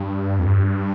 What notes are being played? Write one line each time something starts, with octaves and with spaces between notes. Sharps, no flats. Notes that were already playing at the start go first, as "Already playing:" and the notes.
Already playing: G2
F2
G2